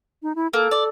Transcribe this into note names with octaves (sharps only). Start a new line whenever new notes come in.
D#4
E4
A#3 A4
D5